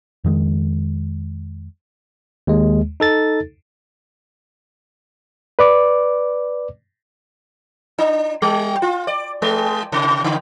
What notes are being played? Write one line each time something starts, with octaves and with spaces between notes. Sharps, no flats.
F2 D#3 G#3
D#2 G#3
D#4 A4 A6
B4 D5 D6
D4
G3
F4
D5
G#3
C3
C#3